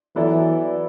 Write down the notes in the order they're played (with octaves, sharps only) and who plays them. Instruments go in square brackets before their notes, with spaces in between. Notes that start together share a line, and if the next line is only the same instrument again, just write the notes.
[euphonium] E3 [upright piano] F#3 B3 E4 A4 D5